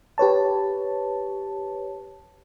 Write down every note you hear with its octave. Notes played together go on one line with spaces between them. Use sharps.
G4 B4 C#5 A5